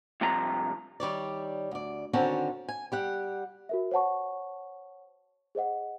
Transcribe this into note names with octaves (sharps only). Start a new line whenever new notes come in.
G2 C3 F3 A#5
D#3 G3 C#5 D5
D2 D5
D3 D#3 C4 C#4 F#4 A5
G#5
G3 G4 F#5
F#4 A#4 E5
C5 C#5 F#5 A5 C#6
G#4 C5 D#5 F#5